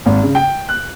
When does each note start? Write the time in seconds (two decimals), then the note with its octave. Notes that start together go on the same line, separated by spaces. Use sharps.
0.06 G#1
0.23 C#3
0.35 G5
0.69 F#6